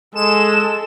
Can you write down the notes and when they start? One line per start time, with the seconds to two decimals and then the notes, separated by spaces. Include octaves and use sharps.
0.15 G#3 A4 E7